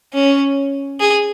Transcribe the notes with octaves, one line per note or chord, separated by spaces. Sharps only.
C#4
G#4